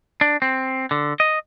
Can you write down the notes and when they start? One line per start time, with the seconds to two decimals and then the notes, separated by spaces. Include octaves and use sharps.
0.21 D4
0.42 C4
0.91 D3
1.20 D#5